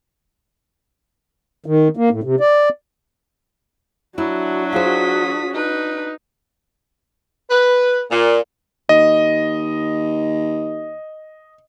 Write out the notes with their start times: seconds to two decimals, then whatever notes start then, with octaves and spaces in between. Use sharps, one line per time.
1.66 D#3
1.97 A#3
2.10 A2
2.23 C3
2.40 D5
4.18 F#3 D4 E4 F#4
4.73 F4 G#4 C5 D#6 B6
5.54 D#4 B4
7.50 B4
8.11 A#2
8.89 D#2 D#5